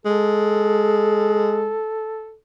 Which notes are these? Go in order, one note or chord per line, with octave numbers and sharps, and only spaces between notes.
G#3 A4